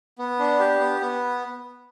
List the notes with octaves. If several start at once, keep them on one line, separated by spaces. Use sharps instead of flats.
B3
D4
G4
B3
B3